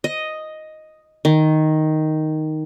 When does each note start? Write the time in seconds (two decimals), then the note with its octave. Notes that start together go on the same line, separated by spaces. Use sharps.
0.04 D#5
1.25 D#3